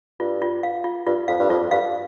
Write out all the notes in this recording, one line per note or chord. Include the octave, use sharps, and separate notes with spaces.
G2 F4
F4
F5
F4
G2 F4
F2 F5
G2
F2 F4
G2 F5